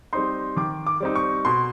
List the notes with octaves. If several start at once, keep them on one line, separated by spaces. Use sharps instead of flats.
G3 C4 D#4 C6
D#3 D6
D6
G3 C4 D#4
C#6
B2 C6